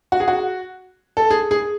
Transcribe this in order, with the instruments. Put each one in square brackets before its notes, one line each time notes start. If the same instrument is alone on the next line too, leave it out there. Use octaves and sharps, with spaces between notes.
[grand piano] F#4
G#4
F#4
A4
G#4
G#4